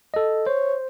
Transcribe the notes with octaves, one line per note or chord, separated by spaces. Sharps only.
A4 D#5
C5 C#5